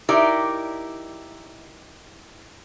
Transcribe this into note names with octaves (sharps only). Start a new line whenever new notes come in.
D#4 E4 G4 A#4 D5